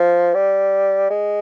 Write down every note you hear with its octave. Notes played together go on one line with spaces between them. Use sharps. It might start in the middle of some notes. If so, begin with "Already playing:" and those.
Already playing: F3
G3
G#3